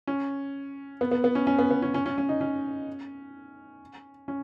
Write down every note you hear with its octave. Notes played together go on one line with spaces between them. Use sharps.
C#4
B3
B3
B3
C#4
C#4
B3
B3
C#4
C#4
C#4
C#4
D#4
C#4
C#4